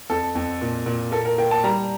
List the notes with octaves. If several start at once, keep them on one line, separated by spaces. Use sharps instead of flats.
F2 A4
F2
A#2
A#2
A#3 A4
A#4
A#3 G5
A5
G3 A#5